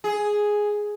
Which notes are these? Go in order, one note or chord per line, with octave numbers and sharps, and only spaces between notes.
G#4